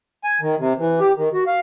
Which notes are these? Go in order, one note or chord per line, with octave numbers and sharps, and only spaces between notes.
G#5
D#3
C3
E3
G4
D#3
F#4
F5